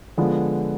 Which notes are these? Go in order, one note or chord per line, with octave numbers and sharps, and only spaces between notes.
D3 F3 G#3 B3